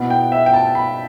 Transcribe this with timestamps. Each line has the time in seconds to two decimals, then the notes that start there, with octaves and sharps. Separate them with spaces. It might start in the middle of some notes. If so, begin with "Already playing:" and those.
Already playing: B2 B3 E4
0.10 G5
0.32 E5
0.46 G5
0.53 A5
0.75 B5